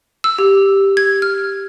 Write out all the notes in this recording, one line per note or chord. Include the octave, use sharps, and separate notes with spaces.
E6
G4
G#6
F6